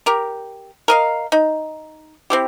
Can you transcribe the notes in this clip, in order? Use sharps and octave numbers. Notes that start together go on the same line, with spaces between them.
G4 A#4
A#4 D#5 F5
D#4
C4 E4 G4